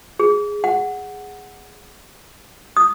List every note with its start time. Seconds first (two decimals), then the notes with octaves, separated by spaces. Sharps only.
0.19 G#4
0.64 F#5
2.77 D#6